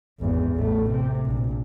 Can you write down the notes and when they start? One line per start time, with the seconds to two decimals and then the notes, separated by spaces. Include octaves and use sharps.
0.20 G#1 E2
0.55 A1 A3
0.90 C3
1.26 A#1